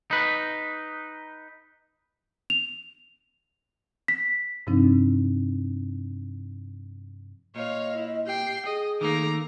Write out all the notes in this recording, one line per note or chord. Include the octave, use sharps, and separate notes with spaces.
D#4 B4
F7
B6
G2 C3 F3 C4 D4 D#4
A#2 C#5 D#5 F5
E4
G4 G5 C7
G#4 D#5
D#3 A3 A#3 A#5 D6